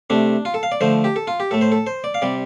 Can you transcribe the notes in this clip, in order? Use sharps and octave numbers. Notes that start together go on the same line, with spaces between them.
C3 A3 D4
F4
A4
F5
D5
D3 F3 A3 C5
G4
A4
F4
G4
A2 A3 A4
C5
A4
C5
D5
F5
C3 G3 D5